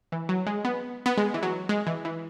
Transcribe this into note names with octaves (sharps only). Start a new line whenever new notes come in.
E3
F#3
G#3
B3
B3
G#3
E3
F#3
G#3
E3
E3